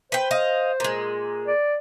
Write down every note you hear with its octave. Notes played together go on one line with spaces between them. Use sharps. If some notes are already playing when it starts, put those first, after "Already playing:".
B4 C5 G5
D#5 F5
A#2 G#3
D5